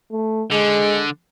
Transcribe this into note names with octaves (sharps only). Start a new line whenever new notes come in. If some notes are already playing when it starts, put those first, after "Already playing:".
A3
D3 G#3